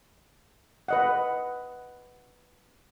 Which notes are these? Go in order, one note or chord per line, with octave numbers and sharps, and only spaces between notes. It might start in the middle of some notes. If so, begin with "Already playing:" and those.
B4 D#5 F#5